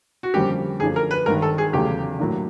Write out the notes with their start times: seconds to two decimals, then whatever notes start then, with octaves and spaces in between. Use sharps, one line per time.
0.23 F#4
0.34 F2 D3 G3 A#3 C#4 G4
0.80 F#2 D3 F3 A3 D4 G#4
0.96 A#4
1.11 B4
1.26 G#1 G2 D#3 A#4
1.42 A4
1.58 G#4
1.73 F1 E2 C#3 F#3 A3 G4
2.19 A2 F#3 A#3 D4